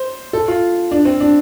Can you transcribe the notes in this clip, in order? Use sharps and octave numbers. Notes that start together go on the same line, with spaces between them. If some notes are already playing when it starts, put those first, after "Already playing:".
Already playing: C5
A4
F4
D4
C4
D4